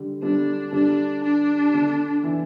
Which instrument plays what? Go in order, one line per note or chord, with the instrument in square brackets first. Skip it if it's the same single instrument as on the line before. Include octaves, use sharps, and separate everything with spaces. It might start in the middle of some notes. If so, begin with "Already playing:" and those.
Already playing: [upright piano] D3 G3
[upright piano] D3 G3 [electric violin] D4
[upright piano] D3 G3 [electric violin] D4
[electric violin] D4
[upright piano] D3
E3